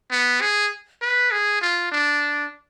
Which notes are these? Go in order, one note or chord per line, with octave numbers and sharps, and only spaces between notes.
B3
G#4
B4
G#4
F4
D4